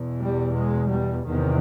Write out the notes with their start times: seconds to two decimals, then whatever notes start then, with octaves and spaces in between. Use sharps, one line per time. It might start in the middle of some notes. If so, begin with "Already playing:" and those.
Already playing: E2 B2
0.20 G3
0.55 G#3
0.91 G3
1.26 E2 C3 D#3